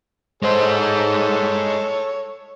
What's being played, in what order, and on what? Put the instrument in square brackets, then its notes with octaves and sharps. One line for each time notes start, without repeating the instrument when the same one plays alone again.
[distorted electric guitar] G#3 C5 [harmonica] A4 C#5